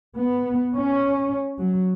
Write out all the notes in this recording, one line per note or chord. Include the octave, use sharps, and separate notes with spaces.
B3
C#4
F#3